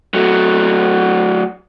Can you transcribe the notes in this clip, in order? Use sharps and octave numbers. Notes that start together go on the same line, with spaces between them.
F#3 A3